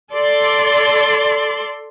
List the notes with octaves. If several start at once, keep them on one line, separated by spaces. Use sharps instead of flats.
A4 D5 C6